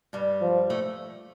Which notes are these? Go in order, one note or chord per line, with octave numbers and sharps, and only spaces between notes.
G2 G3
F3
A2 A3